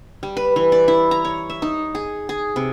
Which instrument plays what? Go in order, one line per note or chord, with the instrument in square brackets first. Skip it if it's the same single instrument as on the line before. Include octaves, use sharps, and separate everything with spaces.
[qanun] G3
B4
E3
D5
E4
A#5
C#5
E5
D#4
G#4
G#4
C3